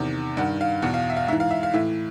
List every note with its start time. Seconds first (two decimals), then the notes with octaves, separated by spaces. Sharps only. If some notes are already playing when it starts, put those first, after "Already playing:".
Already playing: E2 C3 D#3
0.37 G2 D#3 F#5
0.61 F5
0.82 E2 B2 F#5
0.94 F5
1.10 E5
1.16 F5
1.28 G#2 E3 E5
1.40 F5
1.51 E5
1.63 F5
1.73 A2 E3 E5